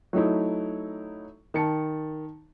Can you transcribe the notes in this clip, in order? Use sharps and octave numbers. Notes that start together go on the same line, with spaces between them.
F#3 A3 D#4 E4
D#3 A5 C#7